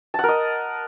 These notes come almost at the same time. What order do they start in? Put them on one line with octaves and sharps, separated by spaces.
A5 F#5 A#4 D#5